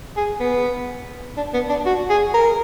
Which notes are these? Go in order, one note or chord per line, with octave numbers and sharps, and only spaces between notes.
G#4
B3
D4
B3
D4
F#4
G#4
A#4